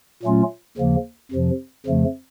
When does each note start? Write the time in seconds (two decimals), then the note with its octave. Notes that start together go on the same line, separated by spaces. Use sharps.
0.23 A#2 F#3 A3 C#4 F4
0.77 D#2 C#3 F3 A#3
1.31 F2 C3 F3
1.86 F2 C#3 F3 A3